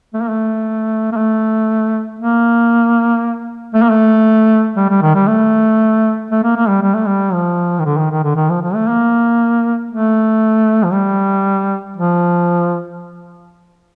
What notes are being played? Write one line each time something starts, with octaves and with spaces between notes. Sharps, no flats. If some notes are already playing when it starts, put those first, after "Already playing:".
A3
A#3
A3
A#3
A3
A#3
A3
A#3
A3
G3
G3
D#3
G3
A3
A3
A#3
A#3
G3
G3
A3
G3
F3
D#3
D3
D#3
D#3
D3
D#3
F3
F3
A3
A#3
A3
F3
G3
F3